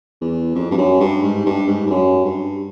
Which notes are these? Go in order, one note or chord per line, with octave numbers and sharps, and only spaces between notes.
E2
F2
G2
F#2
G2
G#2
G2
G#2
G2
F#2
G2